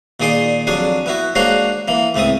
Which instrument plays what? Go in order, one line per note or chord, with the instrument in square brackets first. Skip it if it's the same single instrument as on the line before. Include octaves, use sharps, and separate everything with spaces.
[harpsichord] A#2 D#3 G#4 D5 G#5 C6
F2 F#3 D4 G#4 G#5
B3 E4 F#4
G#3 A#3 D4 F#4 C5 C#5
E3 A#3
C#2 A2 C4 E5 D#6